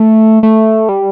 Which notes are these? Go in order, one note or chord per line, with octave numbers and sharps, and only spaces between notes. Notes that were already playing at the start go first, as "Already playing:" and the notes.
Already playing: A3
A3
G3